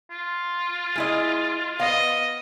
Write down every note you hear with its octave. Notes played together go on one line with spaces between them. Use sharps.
F4
G#3 E4 D#5
B3 D#5 F5